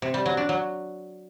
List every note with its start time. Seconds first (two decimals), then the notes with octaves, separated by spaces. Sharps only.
0.02 C3
0.14 G3
0.26 F#3
0.37 D4
0.49 F#3